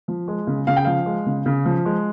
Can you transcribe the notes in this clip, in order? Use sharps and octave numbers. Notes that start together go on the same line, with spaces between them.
F3
G#3
C#3
C#3 F5
G5
F3 F5
G#3
C#3
C#3
F3
G#3